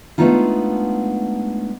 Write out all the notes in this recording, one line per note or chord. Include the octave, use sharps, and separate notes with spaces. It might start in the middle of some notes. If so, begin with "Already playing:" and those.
G#3 A3 B3 D4 D#4 F4